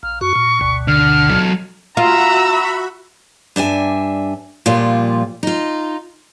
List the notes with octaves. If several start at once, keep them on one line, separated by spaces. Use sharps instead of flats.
A#1 F6
F#2 F#4 C#6
A#2
G1 D2 B2
D3 F6
F#3 A4
F4 F#4 E5 A#5 B5 E6
G2 D4 E5 G#5
A#2 F3 G3 F4
D#4 F4